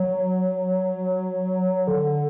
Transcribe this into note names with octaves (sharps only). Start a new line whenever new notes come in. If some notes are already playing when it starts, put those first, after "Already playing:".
Already playing: F#3
D3